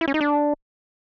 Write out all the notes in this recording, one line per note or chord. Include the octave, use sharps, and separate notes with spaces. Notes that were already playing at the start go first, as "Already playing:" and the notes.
E4
C#4
D#4
D4